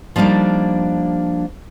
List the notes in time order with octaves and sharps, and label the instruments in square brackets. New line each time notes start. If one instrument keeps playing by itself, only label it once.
[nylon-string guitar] F3 G3 A#3 D4 D#4